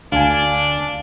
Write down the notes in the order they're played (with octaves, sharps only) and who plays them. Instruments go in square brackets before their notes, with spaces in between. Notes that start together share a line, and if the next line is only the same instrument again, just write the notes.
[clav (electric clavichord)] D2 [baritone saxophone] D4 [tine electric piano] F5 G#5